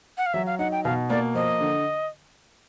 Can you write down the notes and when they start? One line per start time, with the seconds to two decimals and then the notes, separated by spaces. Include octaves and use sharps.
0.18 F#5
0.26 F5
0.34 F#3 E5
0.46 F5
0.59 D#4 F#5
0.72 G5
0.84 B2 F5
1.10 A#3 D5
1.35 F3 D#5
1.61 D3